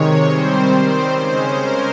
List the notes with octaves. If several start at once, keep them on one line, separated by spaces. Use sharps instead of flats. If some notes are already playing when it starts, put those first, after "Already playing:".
Already playing: C3 D#3 G#3 C#5
D#3 G3 C4 C5
C#3 G#3 C#4
A#4